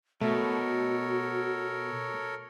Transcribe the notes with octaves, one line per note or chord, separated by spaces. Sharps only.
B2 A3 F#4 A4 A#4 C#5